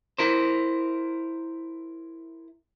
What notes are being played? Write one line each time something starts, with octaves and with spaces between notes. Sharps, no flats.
E4 A#4 C5